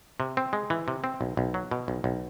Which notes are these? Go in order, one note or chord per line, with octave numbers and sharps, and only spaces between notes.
C3
C4
G#3
E3
C3
C4
B1
B1
F#3
B2
B1
B1